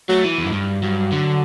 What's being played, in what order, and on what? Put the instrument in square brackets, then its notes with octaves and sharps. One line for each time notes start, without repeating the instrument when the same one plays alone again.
[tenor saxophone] F#3 [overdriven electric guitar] A3
[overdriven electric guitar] E3
E2
F#2
G2
[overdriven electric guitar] G2 [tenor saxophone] F#3
[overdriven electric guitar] D3